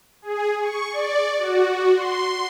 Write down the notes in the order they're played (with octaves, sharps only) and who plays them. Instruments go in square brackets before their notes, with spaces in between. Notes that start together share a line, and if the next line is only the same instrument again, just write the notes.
[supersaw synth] G#4
C#6
D5
F#4
C6